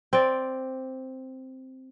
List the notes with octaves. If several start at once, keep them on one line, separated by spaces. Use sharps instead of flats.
C4 D5